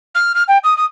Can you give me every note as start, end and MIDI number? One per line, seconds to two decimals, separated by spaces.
0.15 0.32 89
0.35 0.43 89
0.48 0.58 79
0.63 0.76 87
0.77 0.85 87